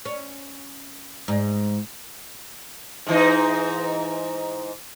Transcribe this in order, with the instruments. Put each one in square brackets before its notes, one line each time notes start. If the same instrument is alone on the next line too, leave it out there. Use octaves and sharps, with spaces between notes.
[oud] C#4
G#2
[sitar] G#2 E3 D#4